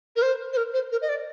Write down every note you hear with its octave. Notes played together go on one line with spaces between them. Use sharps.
A#4
C5
C5
A#4
C5
A#4
D#5
D5